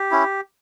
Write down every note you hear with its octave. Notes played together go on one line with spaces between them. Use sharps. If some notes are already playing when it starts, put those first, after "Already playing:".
Already playing: G4
C#4 E4